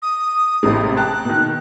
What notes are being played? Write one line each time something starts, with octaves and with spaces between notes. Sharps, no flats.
D#6
A1 C3 G#3
G5 A5 A#5 F#6
B2 D#3